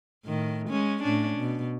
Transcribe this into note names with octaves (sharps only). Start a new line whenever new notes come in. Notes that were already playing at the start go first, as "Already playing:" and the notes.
A2 D#3
G#3 C#4
A2 C#4 D4
B2